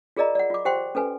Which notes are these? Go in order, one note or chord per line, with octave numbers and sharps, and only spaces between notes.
F4 G#4 A#4 D5 D#5 A#5
D5 F#5
F4 D6
G4 C5 F#5 G5 C6
C#4 A4 B4 G#5